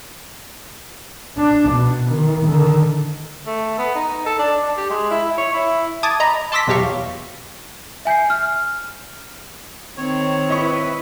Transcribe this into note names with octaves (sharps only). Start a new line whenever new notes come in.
D4
B2
D#3
D3 D#3
A3
B3
D#4
A4
D4
D4
G4
G#3
E4
E4
C#5
E4
A5 D6 D#6 G#6 A6
D#5 A#5 B5
A5 C6 D6 E6 A#6 B6
E2 B2 F#3 G4 F5 C#6
E5 G#5 G6 C7
F6
D#3 C4 C#5
E4 B4 D#5 C#6